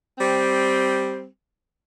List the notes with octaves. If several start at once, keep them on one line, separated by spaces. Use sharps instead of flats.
G3 C4